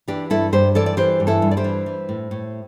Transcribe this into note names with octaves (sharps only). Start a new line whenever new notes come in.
E3 D4 G4
G2 E4 A4
G2 G4 C5
E3 A4 D5
D5
E3 G4 C5
G2
E4 A4
G2
D5
G4 C5
E3
E3
A2
A2